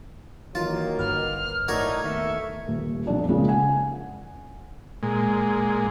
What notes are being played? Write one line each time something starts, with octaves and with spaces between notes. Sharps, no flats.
D#3 E3 F#3 A#3 F4
G1 B4 F6
A2 D#4 F#4 A#4 D5 E5 G#6
D#2 D#3 A3 B3 E5 C#6
D#1
B1 F2 D4 D#4
C#3 G#3 A#3 F4 G#4
F#5 G#5
A#2 G#3